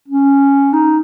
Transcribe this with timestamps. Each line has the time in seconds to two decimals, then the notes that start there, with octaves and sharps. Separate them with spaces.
0.08 C#4
0.73 D#4